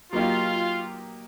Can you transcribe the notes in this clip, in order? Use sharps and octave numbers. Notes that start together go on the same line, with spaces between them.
F#3 A#3 D#4 F4 G4